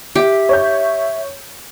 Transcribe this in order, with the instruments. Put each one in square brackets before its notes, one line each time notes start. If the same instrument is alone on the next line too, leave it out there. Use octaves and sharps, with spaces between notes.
[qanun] G4 [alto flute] E5
[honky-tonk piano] C#5 G6